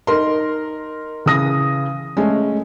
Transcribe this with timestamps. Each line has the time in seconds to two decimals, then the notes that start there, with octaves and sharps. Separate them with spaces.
0.07 D#4 A#4 C6
1.26 C#3 E3 D#6 A#6
2.17 G#3 A3 C#4